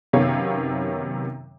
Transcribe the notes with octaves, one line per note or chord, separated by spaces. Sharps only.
F#2 C3 D#3 B3 C#5 F5